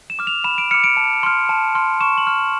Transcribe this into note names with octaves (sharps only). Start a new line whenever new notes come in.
E7
D6 F6
F7
B5 E7
D7
D6 F6 C#7
D7
A5
C6 F6
A5
C6 F6
C#6 E7
F#7
F6